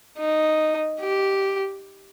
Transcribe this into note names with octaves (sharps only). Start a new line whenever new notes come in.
D#4
G4